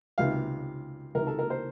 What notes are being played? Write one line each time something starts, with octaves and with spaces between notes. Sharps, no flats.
C#2 C3 D#3 F5
C#2 C3 D#3 A#4
A4
A#4
C5